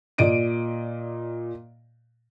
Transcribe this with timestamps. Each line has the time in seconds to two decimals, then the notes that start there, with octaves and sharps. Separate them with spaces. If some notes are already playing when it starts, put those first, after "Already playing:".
0.18 A#2 D5 D#5 D7 D#7